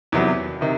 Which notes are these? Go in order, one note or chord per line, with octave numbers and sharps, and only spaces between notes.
E2 C3 D#3 F#3
C3 D#3